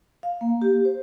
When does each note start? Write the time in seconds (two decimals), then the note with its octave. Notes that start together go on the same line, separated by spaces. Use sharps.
0.23 F5
0.41 A#3
0.62 G4
0.85 C5